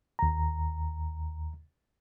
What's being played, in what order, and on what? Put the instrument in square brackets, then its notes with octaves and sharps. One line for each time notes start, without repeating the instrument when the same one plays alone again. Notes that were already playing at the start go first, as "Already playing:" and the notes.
[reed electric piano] D#2 A#5